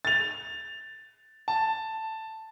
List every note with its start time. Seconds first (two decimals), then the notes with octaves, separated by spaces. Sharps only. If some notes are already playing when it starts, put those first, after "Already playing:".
0.05 A6 F7
1.48 A5